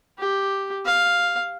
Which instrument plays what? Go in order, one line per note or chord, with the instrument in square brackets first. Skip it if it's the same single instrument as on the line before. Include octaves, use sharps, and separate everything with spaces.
[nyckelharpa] G4
F5